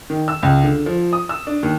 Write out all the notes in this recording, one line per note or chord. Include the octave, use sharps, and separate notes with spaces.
D#3
E6
C#2
D3
F3
D#6
E6
D4
D#2